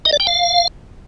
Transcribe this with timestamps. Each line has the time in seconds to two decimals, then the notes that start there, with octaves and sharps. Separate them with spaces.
0.05 D#5
0.13 D5
0.20 G5
0.27 F5